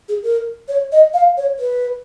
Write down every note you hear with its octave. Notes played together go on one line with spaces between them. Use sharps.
G#4
A#4
C#5
D#5
F5
C#5
B4